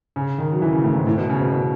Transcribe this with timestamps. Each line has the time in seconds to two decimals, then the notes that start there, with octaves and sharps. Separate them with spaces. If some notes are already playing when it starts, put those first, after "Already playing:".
0.16 C#3
0.38 D#3
0.52 F#3
0.62 E3
0.73 C#3
0.84 A2
0.95 G#2
1.07 A2
1.18 B2
1.30 C#3
1.41 B2
1.53 B2